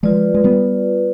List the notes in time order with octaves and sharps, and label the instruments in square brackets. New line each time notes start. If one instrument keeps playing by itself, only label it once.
[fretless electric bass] F3 G#3 [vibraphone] F4 B4 D5
[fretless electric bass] G#3
G3 B3